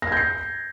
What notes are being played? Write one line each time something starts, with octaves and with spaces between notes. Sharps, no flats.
G6 G#6 A#6 C7